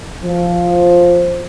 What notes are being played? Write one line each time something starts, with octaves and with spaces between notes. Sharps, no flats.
F3